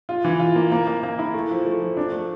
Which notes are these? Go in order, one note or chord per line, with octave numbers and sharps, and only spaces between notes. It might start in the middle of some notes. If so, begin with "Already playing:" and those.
F4
E3
F4
A#3
A#3
A#3
A#3
E4
A3
F3
A3
F3
D4
A3